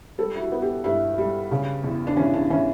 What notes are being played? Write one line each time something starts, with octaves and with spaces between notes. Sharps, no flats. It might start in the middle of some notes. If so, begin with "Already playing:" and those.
G3 A4
E4
F#4
B3
G4
G2 E4
G3
C#3
E2
D4
E3 C#4
D4
E3 C#4